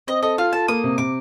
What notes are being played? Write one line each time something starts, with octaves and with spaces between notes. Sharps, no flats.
C4 D#5
A4 D#5
F4 F5
A4 A5
A#3 D#6
C3
C3 D6